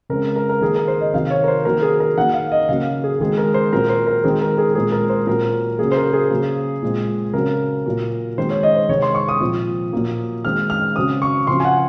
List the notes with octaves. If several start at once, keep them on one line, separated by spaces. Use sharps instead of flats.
C#3 G#3 C4 A#4
A#4
A#4
D#3 A#3 G#4
A#4
C5
D#5
C3 D#3 F#3 C4 F5
C#5
A#4
C5
D#3 F#3 A#3 A#4
G#4
A#4
D#3 A#3 F#5
F5
D#5
C#3 F#3 A#3 F5
G#4
D#3 G#3 C4 G#4
A#4
C5
A#2 F#3 C4 A#4
C5
A#4
D#3 G#3 C4 G#4
A#4
G#4
A#2 G#3 C4 G#4
A#4
C5
A#2 F#3 C4 A#4
C#3 F#3 A#3 G#4
C5
A#4
G#4
C#3 F#3 A#3
A#2 G#3 C4
C#3 F#3 C4 A#4
A#2 F#3 A#3
D#3 G#3 C4 C5
C#5
D#5
C5
C3 D#3 G#3 C4 C#5
C6
C#6
D#6
A#2 F3 C4
A#2 F#3 A#3
D#3 G#3 C4 F6
F6
C#3 F#3 C4 D#6
C#6
C#3 F3 C4 C6
G#5
F#5